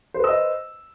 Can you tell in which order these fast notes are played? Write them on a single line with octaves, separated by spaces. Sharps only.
C5 B4 E6 D#5